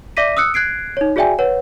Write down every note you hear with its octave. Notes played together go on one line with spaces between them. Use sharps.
D5 E5 D6 A#6 B6 D#7
D#6 E6 F#6 C#7
F#6 G#6 C7 D7
D#4 C#5
F#4 G#4 D5 E5 G5 G#5
B4 C#5 F#5